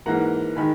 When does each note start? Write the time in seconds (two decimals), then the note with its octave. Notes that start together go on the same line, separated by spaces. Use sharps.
0.06 G#2 E3 A#3 F#5 A#5
0.56 D#3 G#3 G#5 B5